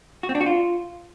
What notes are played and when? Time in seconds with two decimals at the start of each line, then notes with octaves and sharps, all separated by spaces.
0.23 F#4
0.29 C4
0.35 D4
0.41 F#4
0.46 F4